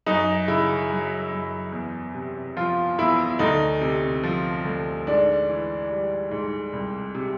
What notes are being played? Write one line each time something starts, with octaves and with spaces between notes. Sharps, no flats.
F#2 D#4
C#3 E4
F#3
F#2
E2
C3
F3 F4
E2 E4
D2 D#4
C3
F3
D2
G#2 D4
E3
G3
G#2
C2
C3